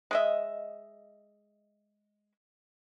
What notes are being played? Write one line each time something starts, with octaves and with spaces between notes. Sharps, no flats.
G#3 D#5 E5